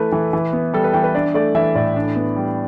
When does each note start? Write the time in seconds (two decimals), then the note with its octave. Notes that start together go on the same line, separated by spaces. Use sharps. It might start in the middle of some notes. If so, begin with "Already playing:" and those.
Already playing: E3 A3 E4 B4 A5
0.12 E3
0.33 E3
0.53 B3
0.73 G3 A4
0.84 B4
0.93 E3 G5
1.04 B4
1.15 D4 D5
1.34 A3 D5
1.55 E3 E5
1.75 A2 D5
1.96 D4
2.16 B3
2.36 G3